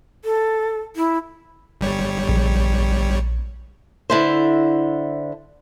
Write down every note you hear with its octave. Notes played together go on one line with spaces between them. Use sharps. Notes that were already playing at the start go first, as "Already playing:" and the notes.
A4
E4
G1 G3 C#5
A#1
D3 E4 C5